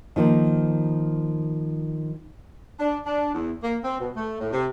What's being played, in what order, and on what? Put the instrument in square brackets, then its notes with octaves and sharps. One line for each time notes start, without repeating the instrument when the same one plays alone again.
[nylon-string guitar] D#3 F3 A#3
[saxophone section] D4
D4
E2
A#3
C4
B2
A3
A2
C3